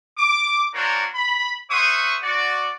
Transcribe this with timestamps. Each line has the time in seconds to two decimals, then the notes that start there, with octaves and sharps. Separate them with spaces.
0.18 D6
0.74 A#3 D4 F#4 A#4 C5 C#5
1.15 B5
1.70 G#4 C5 E5 F#5 C#6 D#6
2.22 F#4 D5